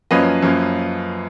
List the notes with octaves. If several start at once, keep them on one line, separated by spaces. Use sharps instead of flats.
F#2 F3 A#3 C#4 B4 D#5
F#2 F3 A#3 C#4